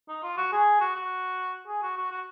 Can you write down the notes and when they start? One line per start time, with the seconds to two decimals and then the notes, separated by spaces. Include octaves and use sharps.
0.08 D#4
0.23 F4
0.37 F#4
0.52 G#4
0.80 F#4
0.95 F#4
1.67 G#4
1.82 F#4
1.97 F#4
2.11 F#4